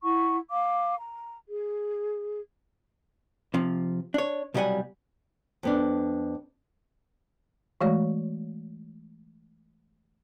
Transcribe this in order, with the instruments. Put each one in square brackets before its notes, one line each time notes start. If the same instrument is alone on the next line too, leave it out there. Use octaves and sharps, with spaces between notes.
[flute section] E4 F#5 C#6
F5 D6
A#5
G#4
[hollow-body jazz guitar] C3 F3
D4 C#5
C2 B2 F#3 G3 F#5 G#5
[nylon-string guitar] F2 B3 D4
[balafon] E3 G#3 A3 F#4 C#5 D5